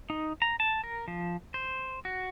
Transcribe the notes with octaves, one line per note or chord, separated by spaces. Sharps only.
D#4
A#5
A5
A#4
F3
C5
F#4